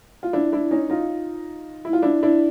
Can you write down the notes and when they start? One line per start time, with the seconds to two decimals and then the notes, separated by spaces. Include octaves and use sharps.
0.23 F4
0.33 D4 E4
0.52 D4 E4
0.71 C#4 D#4
0.90 D#4 F4
1.85 E4
1.93 F4
2.02 D4 E4
2.23 D4 E4